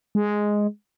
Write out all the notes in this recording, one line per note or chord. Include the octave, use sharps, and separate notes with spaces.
G#3